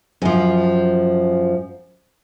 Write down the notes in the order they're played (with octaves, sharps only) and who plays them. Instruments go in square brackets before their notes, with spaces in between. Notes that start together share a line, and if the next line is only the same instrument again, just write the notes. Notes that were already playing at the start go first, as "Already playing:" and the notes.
[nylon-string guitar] F#2 F3